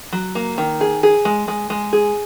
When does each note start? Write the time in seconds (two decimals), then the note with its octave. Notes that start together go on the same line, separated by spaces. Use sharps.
0.13 F#3
0.35 A#3
0.58 D#3
0.81 G#4
1.03 G#4
1.25 G#3
1.48 G#3
1.70 G#3
1.93 G#4